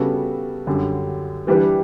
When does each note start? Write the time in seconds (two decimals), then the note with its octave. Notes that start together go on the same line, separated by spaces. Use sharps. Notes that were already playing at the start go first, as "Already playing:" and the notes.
Already playing: C#3 G3 B3 F#4 A4
0.67 F#2 D3 G3
1.47 E3 G3 D4 G4 B4